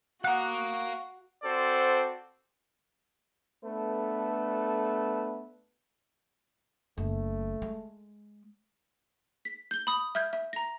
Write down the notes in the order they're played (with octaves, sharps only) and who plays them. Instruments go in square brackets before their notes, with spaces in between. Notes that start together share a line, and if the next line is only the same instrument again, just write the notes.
[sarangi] F#4 [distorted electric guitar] F5 A#5 [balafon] F#5 [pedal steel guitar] D#6 F#6
[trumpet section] C4 F#4 A4 C5 D5
[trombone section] A3 B3 D4 A4 B4
[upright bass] F#1 [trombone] A3
[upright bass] G#3
[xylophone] B6
G6 G7
B5 D#6
E5 F6 G6 G#6
E5
A#5 A#6